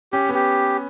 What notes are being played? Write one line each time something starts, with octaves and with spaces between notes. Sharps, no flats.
C#4 G4
B3
G4